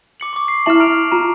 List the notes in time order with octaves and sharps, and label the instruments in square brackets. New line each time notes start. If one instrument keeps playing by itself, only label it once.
[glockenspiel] D6 C#7 F#7
C#6 D6
C7
[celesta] E4 E5 A5 [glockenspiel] F6 E7 F#7
[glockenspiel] A#5 D7 F7 [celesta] F6
[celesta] F4 A#5 [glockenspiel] A5